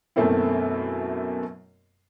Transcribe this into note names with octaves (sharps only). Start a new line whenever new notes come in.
F#2 B2 A3 A#3 C4 E4